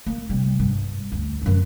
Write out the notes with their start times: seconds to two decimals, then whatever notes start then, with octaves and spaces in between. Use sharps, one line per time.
0.06 A#3
0.30 C3 G3
0.60 G2
1.12 D2
1.42 F#2 E3